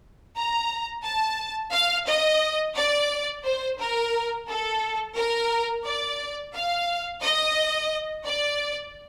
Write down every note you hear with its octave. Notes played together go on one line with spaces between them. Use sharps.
A#5
A5
F5
D#5
D5
C5
A#4
A4
A#4
D5
F5
D#5
D5